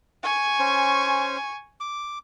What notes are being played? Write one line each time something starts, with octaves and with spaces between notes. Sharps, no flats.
G#5 C#6
C#4 C5
D6